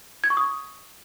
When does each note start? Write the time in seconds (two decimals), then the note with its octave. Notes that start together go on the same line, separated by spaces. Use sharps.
0.24 G#6
0.30 C#6
0.37 D#6